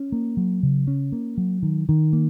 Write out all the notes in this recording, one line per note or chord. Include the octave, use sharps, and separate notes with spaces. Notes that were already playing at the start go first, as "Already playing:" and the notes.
Already playing: C#4
A#3
F#3
C#3
C#4
A#3
F#3
D#3
D#3
A#3